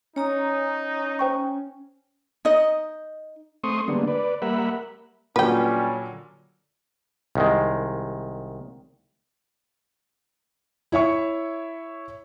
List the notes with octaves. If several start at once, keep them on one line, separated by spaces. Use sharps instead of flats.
C#4 D#4 C#5 A#5 D#6
C5 G5 C#6
D#4 D#5
A3 C4 C6 C#6 D#6
D3 G3 G#3 A#3 B3 D4
B4 D5
G3 A#3 A#4 E5 F#5 B5
A#2 D3 F#3 G3 C#4 B4 G5
C2 D#3 G#3
E4 C#5 E5 C#6